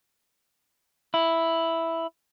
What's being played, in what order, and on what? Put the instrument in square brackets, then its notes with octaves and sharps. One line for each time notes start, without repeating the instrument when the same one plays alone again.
[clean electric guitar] E4